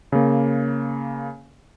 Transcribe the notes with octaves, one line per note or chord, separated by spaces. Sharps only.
C#3 A#3